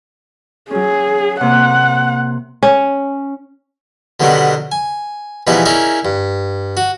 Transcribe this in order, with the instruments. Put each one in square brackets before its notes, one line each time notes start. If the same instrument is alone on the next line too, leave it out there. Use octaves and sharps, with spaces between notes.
[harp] F#3 C#4 [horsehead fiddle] G#4
[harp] C3 A#3 [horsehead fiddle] F#5
[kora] C#4
[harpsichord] B2 D3 D#3 F#3 G3 B3
G#5
B2 E3 F3 G3 D#4 G#4
C#4 D#4 E4 G#4 A#4 D5
G2
F#4